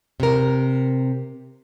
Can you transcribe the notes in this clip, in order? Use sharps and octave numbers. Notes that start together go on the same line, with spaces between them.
C3 A#4